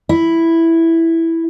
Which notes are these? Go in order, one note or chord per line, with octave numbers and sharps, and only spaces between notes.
E4